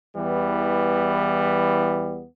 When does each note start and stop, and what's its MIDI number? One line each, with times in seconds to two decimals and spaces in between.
0.16 2.25 40
0.16 2.25 52
0.16 2.25 55
0.16 2.25 59